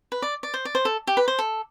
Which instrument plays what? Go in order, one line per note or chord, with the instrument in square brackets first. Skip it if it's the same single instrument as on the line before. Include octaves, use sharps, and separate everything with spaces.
[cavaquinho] B4
D5
D5
C5
D5
C5
A4
G4
B4
C5
A4